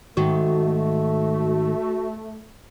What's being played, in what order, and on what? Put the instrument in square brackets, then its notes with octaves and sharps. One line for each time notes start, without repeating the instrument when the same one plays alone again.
[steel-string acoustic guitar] G#2 D#3 [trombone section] A3 [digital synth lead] F#4